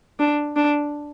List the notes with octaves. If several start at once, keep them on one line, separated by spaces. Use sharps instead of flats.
D4
D4